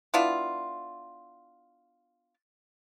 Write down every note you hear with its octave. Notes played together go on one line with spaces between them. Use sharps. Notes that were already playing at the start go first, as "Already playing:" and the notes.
B3 D4 E4 F4